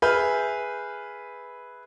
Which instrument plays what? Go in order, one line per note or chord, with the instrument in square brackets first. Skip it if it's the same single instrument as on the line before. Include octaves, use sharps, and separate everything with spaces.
[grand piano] G#4 B4 E5 F6 G6